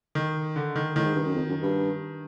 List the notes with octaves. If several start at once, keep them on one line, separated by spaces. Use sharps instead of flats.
D#3
D3
D#3
A2 D#3
G#2
G2
F#2
F2
F#2
G2